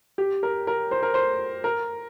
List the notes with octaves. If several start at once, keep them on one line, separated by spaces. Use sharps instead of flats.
G4
A#4
A#4
C5
A#4
C5
A#4